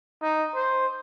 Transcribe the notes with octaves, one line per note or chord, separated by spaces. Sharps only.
D#4
C5